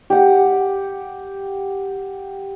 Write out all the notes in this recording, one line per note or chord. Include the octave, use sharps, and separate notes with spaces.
G4 F#5